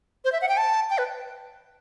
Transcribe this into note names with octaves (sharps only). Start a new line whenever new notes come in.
C5
E5
F#5
G5
A5
G5
B4